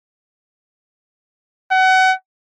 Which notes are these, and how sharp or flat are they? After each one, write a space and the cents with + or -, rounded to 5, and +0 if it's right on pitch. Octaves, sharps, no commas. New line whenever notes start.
F#5 +30